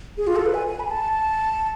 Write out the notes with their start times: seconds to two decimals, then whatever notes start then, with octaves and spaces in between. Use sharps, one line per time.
0.18 G#4
0.27 F4
0.36 A4
0.46 B4
0.54 G#5
0.67 G#5
0.80 B5
0.85 G#5
0.91 A5